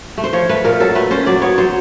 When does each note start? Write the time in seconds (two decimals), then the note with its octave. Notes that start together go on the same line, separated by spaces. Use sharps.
0.18 A3
0.24 C5
0.33 F3 C#5
0.49 A3 B4
0.64 A#2 A#4
0.80 F#3 A4
0.95 A3 B4
1.11 C#4 C5
1.27 F#3 D5
1.42 B3 C#5
1.58 F#3 C5